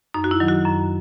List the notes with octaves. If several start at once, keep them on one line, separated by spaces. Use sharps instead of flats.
F#2 D#4
F#4
E4
D#3 F#3
F#4
F#2